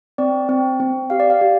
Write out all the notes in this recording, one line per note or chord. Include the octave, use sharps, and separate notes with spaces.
C4 D5
C4
C4
G4 F5
D5
F5
G4